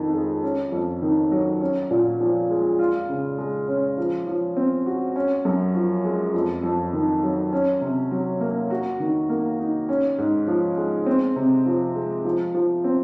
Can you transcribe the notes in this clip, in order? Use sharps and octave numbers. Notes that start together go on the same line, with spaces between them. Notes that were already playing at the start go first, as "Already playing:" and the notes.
Already playing: F2 D#3
G#3
C#4
F2
D#3
F#3
C#4
A#2
F3
G#3
F4
C#3
G#3
C#4
F3
F3
C4
F#4
C#4
F#2
F3
G#3
F2
F2
D#3
F#3
C#4
C3
F#3
A#3
F#4
D#3
A#3
D#4
C#4
G#2
F3
G#3
C4
C3
F3
G#3
F3
F3
C4